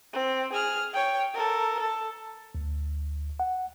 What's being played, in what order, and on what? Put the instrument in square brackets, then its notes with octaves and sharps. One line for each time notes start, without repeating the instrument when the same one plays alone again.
[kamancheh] C4
G#4 F6
C#5 G5
A4 A#4
A4
[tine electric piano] D2
F#5